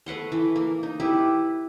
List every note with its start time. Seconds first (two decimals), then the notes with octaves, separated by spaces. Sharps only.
0.06 A3 B4 F#5 C6
0.32 E3
0.56 A#3
0.83 D#4
1.00 E4 G4 B4